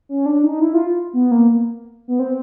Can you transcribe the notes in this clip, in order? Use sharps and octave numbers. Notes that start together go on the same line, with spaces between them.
C#4
D4
D#4
E4
F4
B3
A#3
B3
C4